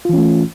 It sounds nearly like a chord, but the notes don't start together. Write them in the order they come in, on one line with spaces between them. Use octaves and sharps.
F4 E3 C#4 A3